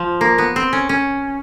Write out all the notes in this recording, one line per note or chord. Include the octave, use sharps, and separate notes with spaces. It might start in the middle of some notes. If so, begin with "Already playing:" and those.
Already playing: F3
A#3
B3
C4
C#4
C#4